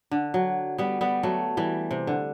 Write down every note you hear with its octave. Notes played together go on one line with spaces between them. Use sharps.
D3
F#3
G3 B3
G3 B3
F#3 A3
E3 G3
C3
D3